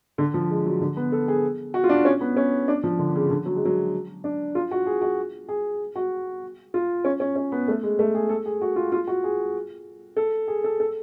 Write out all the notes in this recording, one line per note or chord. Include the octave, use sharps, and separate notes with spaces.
D3
F3
G#3
F#3
D3
B3
A4
G#4
F#4
F4
D4
C#4
B3
C#4
D4
F3
D3
C#3
D3
F#3
G#3
F#3
D4
F4
F#4
G#4
F#4
G#4
F#4
F4
C#4
C#4
C#4
B3
A3
G#3
A3
G#4
A4
G#4
F#4
F4
F4
F#4
G#4
A4
G#4
A4
A4